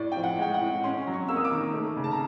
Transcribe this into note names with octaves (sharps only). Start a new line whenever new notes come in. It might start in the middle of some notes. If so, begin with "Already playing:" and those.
Already playing: A2 D5
F3 G5
F#5
G#3 G5
F#5
A2
C#4 C6
F#3
C#6
A#3 E6
D#6
D6
D#3
A3
C#3
A5
A#5